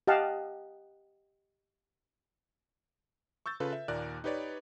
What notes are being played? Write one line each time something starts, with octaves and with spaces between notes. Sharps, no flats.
G4 D#5 F5 F#5 A5
C#6 E6 G6 A6
C#3 F4 A4 B4
E5
D#2 A#2 A#4 D5 F#6
D#4 G4 B4 C#5 D5